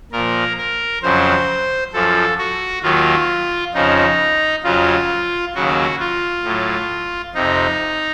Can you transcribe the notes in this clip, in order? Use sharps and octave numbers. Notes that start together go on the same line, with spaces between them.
A#2 F3 A#4
A#4
F2 C#3 F#3 C5
F#2 F3 A4
F#4
D#2 D#3 F#3 F4
F2 C#3 F3 D#4
F2 C#3 F#3 F4
D#2 C#3 F#3 F#4
F4
A2 F#3
F2 C3 D#4